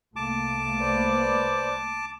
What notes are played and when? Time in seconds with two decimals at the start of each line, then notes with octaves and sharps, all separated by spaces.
0.16 C2 A3 A#3 A5 D6
0.80 B4 C5 D5